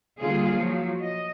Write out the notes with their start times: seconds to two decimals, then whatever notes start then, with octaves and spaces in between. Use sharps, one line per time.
0.20 D3 G3 A#3 F4 G#4
0.53 F3 F#3
1.02 D#5